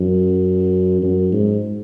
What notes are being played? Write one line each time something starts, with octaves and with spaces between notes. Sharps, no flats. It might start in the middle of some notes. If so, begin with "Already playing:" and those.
Already playing: F#2
F#2
G#2